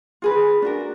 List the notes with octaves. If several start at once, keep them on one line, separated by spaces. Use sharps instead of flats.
F4 G#4 B4
D4 F#4 A#4